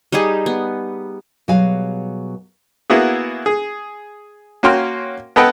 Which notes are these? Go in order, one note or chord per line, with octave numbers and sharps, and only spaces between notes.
G3 D#4 G4 G#4
B3
B2 F#3 G3 G#4 F5 G#5
A#3 B3 E4 F#4 G#4
G#4
A#3 C#4 F#4 G5 C6 F6
B3 A4 B4 D#5 F#5 G5